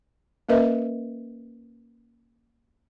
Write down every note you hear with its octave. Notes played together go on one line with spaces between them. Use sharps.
A#3 C#4 A#4 B4 D#5 E5